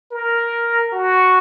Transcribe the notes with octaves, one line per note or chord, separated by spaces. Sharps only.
A#4
F#4